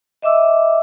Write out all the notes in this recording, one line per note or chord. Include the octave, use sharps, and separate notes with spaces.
D#5 E5 D6 E6